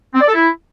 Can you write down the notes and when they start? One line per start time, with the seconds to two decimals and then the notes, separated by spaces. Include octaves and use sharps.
0.14 C4
0.21 D5
0.28 A4
0.34 E4